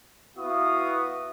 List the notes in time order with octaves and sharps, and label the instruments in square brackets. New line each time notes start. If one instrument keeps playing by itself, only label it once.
[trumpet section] B3 E4 F#4 F5 D#6